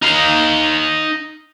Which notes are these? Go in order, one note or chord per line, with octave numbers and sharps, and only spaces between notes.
D#4 F5